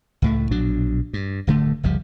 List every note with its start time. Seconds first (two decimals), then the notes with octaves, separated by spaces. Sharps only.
0.22 C#2 A2 A3
0.51 A#1 B2 F#3 D4
1.13 G2
1.47 D1 G2 D3 A3
1.83 F#1 C#2 F3 G3